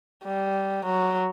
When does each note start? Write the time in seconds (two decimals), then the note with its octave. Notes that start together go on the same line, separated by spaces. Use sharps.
0.24 G3
0.86 F#3